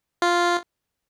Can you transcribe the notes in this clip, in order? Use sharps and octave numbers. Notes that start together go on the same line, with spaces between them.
F4